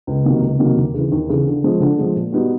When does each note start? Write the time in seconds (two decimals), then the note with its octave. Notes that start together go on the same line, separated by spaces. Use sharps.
0.07 C#2
0.24 C3 D#3 F#3 A#3
0.41 C#2
0.59 C3 D#3 F#3 A#3
0.77 D#2
0.94 C#3 E3
1.12 D#2
1.29 C#3 E3
1.46 D3
1.64 F3 G#3
1.80 D3
1.98 F3 G#3
2.16 A#2
2.32 G3 B3 D#4 F#4